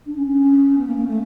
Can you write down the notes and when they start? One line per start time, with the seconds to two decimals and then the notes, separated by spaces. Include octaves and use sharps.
0.06 D4
0.17 C#4
0.27 C#4
0.77 B3
0.87 A#3
0.97 A#3
1.07 A3